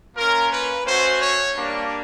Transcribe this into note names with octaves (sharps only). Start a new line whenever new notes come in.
A#3 C#4 F4 A#4
B4
A3 C#4 F#4 C5
C#5
G3 A#3 D4